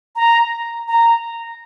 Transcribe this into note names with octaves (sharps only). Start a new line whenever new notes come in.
A#5
A#5